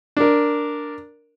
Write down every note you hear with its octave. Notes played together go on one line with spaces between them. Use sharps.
D4 A#4